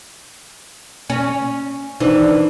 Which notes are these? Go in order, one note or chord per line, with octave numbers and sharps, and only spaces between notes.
C#4
D#3 E3 D4 C5